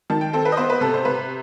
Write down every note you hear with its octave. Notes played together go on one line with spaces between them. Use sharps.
D#3 A5
G5
C4 A4
B4
D#5
B3 C5
B4
C3 A4
C5
C3 B4